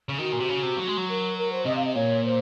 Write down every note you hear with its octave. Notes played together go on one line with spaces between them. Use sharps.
C#3
D#3 F#4
A#2
C3
C#3
C3
F#3
G#3
F#3
A#4
A#4
C5
C3 D#5
F5
D#5
A#2 C#5
C5